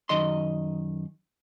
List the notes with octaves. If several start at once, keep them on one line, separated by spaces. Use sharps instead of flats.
F#2 D#3 D#5 C6